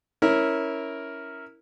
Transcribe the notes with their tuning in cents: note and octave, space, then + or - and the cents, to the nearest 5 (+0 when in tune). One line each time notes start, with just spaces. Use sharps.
C#4 +0 E4 -15 A#4 +0